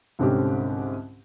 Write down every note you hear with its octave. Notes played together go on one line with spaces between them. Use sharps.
C2 G#2 D3 C4 C#4 G4